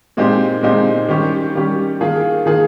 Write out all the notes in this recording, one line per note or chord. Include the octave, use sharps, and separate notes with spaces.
A#2 G#3 C4 D#4 G4
A#2 G#3 C4 D#4 G4
D#3 G3 C#4 G4
D#3 G3 C#4 G4
D#3 A#3 F4 G#4
D#3 A#3 F4 G#4